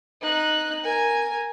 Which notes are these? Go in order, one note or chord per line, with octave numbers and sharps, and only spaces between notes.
D#4 F#6
A#4 G#5